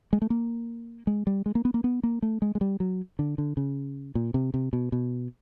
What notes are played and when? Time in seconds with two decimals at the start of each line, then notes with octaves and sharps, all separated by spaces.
0.13 G#3
0.22 A3
0.30 A#3
1.07 G#3
1.27 G3
1.46 G#3
1.55 A#3
1.65 B3
1.74 A#3
1.84 B3
2.03 A#3
2.22 A3
2.42 G#3
2.55 G#3
2.61 G3
2.80 F#3
3.19 D3
3.38 D3
3.57 C#3
4.15 A#2
4.34 C3
4.54 C3
4.73 B2
4.92 B2